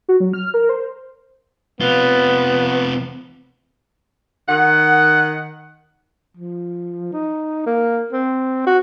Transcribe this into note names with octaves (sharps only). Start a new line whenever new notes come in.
F#4
F#3
F6
A#4
C5
C3 B3 F4
D#3 F#5
F3
D#4
A#3
C4
F#4